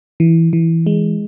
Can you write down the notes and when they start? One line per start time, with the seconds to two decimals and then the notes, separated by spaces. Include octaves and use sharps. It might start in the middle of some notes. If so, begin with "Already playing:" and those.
0.20 E3
0.53 E3
0.86 G#3